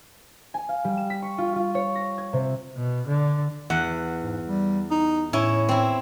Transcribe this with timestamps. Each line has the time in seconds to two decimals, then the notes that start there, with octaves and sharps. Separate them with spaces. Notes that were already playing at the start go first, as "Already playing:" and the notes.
0.54 G#5
0.69 F5
0.84 G3
0.97 E7
1.10 B6
1.22 C#6
1.38 F4
1.56 F4
1.75 C#5
1.95 A#6
2.18 G#6
2.33 C3
2.77 B2
3.07 D3
3.70 E2 F#5
4.23 G#2
4.46 G3
4.91 D#4
5.33 A2 C#4 E4
5.69 C4 E4